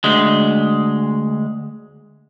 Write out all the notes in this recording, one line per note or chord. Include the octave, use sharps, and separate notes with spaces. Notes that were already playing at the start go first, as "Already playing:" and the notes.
D2 G#3